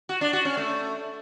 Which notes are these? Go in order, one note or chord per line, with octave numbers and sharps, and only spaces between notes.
F#4
D4
F#4
C#4
A3